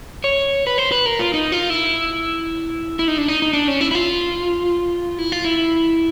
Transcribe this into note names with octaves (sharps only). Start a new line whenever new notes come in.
C#5
B4
C5
B4
A#4
F4
D#4
F4
E4
E4
D#4
D4
D#4
D#4
D4
C#4
E4
E4
F4
E4
F4
E4